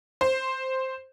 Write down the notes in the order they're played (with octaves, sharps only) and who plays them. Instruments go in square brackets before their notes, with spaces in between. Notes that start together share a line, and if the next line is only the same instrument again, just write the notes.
[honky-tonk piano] C5